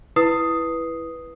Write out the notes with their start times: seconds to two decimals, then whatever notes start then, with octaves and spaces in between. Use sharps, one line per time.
0.16 E4 B4 D#6 C7